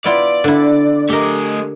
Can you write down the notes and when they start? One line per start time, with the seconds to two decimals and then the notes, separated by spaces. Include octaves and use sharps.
0.05 B3 E4 F4 D5
0.44 D3 E4
1.10 A3 G4 A#4 D#5